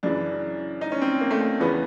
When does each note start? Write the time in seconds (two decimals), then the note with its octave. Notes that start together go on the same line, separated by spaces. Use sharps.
0.03 F#2 C#3 E3 D4
0.81 D#4
0.92 C#4
1.01 C4
1.21 A#3
1.31 A3
1.41 A3
1.60 E2 C#3 E3 B3